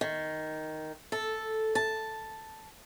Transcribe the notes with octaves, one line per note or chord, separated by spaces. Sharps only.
D#3
A4
A5